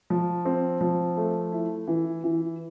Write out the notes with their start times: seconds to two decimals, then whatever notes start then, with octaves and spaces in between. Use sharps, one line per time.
0.10 F3
0.45 C4
0.81 F3
1.17 A3
1.52 E4
1.88 E3
2.24 E3